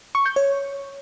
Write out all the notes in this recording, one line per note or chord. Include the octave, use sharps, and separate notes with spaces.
C#6
G6
C#5